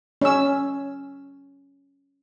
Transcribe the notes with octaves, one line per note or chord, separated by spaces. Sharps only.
C#4 E6